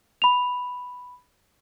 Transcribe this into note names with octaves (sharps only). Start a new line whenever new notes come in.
B5 F7